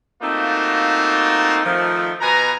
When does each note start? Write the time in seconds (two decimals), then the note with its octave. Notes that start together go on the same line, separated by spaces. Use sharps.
0.22 A3 A#3 C4 D#4 F4 F#4
1.65 D#3 F3 A3
2.21 B2 B4 G#5 A#5